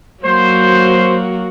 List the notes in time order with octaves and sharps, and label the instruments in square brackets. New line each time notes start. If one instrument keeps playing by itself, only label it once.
[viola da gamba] F#3 A#3 F#4 [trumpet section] C5